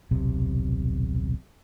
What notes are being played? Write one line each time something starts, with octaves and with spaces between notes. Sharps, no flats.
D#1 B1 C3